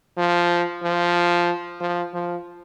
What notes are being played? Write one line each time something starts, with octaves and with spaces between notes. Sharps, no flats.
F3
F3
F3
F3